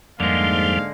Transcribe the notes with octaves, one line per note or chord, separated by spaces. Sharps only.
F2 G#2 D3 F3 G3 G#3 A#3 F5